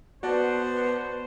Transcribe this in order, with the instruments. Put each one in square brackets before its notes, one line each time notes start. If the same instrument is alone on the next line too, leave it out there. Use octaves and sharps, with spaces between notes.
[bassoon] B2 [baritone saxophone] B3 [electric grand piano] F#4 D5 A5 [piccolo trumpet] C5